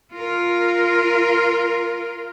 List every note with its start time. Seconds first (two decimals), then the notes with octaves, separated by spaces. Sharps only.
0.14 F4 A#4